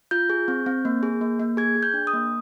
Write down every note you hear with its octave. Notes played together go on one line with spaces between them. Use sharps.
F4 G6
G#4
C4
C4
A#3
G#4
A#3
A#3
G#4 G#6
G#4
G6
D4
D#6
A#3